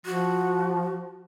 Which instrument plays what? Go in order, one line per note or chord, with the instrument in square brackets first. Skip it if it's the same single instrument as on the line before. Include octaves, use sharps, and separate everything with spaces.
[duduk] F3 [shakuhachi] F#4